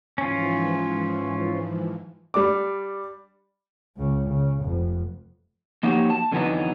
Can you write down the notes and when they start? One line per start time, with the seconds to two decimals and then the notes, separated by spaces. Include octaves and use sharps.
0.18 G#2 E3 F3 C#4 F4
2.34 G3 D4 D6
3.96 C#2 C#3
4.29 C#3
4.61 F1 F2
5.83 F3 A#3 D#4 F#4 G4 C#5
6.10 A5
6.32 F2 D3 E3 F#3 B3 D#4